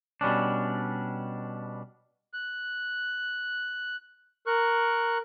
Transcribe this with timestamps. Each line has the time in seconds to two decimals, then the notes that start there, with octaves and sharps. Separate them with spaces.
0.21 B2 G3 C#4 D4
2.33 F#6
4.47 A#4 C#6 F#6